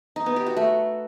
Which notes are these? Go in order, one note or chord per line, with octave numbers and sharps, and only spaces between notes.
D#4
B3
G4
F#4
A3